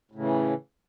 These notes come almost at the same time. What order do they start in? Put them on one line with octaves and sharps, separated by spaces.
A2 C#3 E3